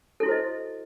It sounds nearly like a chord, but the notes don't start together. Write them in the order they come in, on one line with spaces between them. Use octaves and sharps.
A4 E4 F#4 C5 D#5